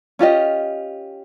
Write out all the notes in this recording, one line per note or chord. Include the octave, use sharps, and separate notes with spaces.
C#4 F4 G4 D#5